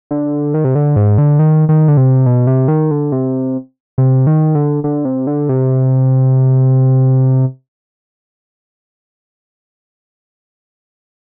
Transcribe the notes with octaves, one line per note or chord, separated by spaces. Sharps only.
D3
D#3
C3
D3
G#2
D3
D#3
D#3
D3
C3
B2
C3
D#3
D3
C3
C3
D#3
D3
D3
C3
D3
C3